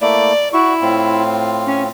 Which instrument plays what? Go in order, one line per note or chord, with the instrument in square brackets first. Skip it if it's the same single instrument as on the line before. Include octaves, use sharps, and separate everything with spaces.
[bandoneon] A3 A#3 E4 [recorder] D5
[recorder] E4 [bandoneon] F#4 C#6
[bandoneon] A2 C4 F4
[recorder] C#4